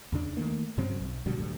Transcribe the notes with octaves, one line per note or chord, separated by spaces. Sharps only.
E2 C#3 D4
D#3 F3 A3 A#3
G2 C#3 F#3 C4
B1
B2 D3 F#3 G3
D2 A2 G3